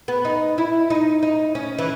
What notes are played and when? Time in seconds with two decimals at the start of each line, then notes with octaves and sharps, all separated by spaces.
0.08 B3
0.25 D#4
0.58 E4
0.90 D#4
1.23 D#4
1.55 C#4
1.78 E3